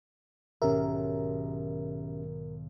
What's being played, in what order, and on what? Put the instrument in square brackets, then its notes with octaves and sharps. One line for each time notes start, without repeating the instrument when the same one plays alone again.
[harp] B1 G#2 D#3 [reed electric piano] C#4 G4 E5 [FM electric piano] A#4